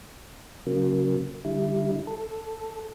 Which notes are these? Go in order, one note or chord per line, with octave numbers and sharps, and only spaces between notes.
C#3 F#3 A#3
D3 G3 E4
A4